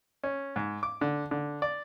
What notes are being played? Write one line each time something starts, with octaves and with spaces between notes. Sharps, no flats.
C#4
G#2
D6
D3
D3
D5